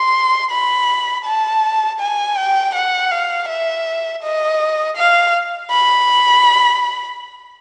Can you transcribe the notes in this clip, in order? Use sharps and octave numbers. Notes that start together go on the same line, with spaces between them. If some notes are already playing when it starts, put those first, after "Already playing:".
Already playing: C6
B5
A5
G#5
G5
F#5
F5
E5
D#5
F5
B5